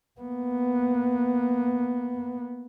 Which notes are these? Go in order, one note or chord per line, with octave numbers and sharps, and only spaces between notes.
A#3 B3